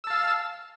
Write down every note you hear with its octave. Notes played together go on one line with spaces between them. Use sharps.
F5 A5 E6